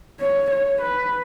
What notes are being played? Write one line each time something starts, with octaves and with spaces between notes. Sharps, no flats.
C#5
C#5
B4